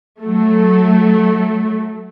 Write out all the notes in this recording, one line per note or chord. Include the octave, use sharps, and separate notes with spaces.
F#3 A3